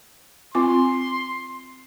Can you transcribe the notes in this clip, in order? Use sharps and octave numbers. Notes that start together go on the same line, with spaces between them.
C4 F4 C6 D6